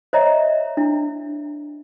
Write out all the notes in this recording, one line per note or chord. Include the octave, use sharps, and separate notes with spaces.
C5 C#5 D#5 E5 A#5
D4 E4